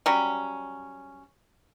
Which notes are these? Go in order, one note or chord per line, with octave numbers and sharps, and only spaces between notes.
F#3 G3 C#4